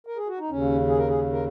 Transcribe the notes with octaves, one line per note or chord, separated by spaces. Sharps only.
A#4
G#4
F#4
D#4
D#2 C#3 C#4
G#4
A#4
G#4
A#4